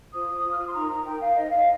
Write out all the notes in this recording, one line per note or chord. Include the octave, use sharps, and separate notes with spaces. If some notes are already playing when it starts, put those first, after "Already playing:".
F4 C5 D#6
F4 C5
F6
D#6
C6
D#4 A#4 A#5
A#5
D#4 A#4 G5
F5
D#4 C5 D#5
F5